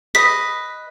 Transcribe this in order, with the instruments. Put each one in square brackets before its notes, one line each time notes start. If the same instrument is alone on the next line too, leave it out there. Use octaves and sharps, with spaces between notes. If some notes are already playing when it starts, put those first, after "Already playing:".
[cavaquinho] B4 D#5 [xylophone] B6